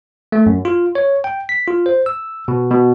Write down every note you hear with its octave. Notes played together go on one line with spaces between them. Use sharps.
A3
F#2
F4
C#5
G5
B6
F4
C5
E6
B2
B2